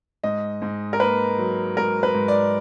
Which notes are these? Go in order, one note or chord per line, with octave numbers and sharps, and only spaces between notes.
G#2 D#5
G#2
A#4
A#3 B4
F#3
G#2 A#4
B4
G#2
D5